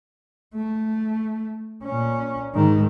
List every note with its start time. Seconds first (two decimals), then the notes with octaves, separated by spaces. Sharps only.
0.56 A3
1.84 A#2 C#4
2.55 G#2 D#3